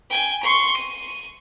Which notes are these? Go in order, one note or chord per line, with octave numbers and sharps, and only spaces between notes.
G5 G#5
C6 C#6
D#7